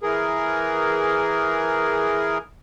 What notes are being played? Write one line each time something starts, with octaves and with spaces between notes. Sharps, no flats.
E3 G#4 A#4